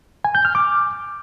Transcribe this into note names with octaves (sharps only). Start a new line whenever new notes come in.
G#5
G6
F6
D6